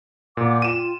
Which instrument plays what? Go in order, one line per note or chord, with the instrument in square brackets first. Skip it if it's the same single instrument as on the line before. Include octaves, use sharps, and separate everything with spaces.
[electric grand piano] A#2 [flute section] F#5 D6
[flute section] F4 G5 [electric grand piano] D#7 E7